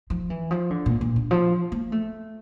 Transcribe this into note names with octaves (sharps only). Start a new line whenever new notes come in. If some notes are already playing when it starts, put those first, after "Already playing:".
F3
E3
F3
D3
A#2
A#2
D3
F3
A#3
A3